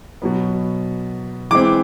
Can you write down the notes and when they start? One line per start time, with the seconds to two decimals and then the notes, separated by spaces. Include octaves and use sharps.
0.22 B2 F#3 B3
1.51 E3 G#3 C4 D6